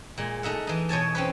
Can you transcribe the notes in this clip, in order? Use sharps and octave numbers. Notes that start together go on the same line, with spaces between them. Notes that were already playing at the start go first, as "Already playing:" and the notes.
A#2 G#3
A3 D#4 E5 F#5
E3 D#4
B2 C#5 G#5 A5
C4 C#4 B4